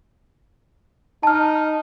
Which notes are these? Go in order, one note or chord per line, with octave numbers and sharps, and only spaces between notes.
D#4 A5 F6